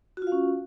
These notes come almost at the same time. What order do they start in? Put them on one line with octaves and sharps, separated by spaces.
F#4 F4 F5 C#4